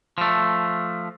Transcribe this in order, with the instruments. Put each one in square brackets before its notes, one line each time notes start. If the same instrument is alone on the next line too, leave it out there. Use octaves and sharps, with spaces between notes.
[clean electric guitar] F3 A3